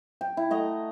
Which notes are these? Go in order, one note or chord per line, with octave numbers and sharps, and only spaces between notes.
G5
E4
A3 D#5 F#5 A#5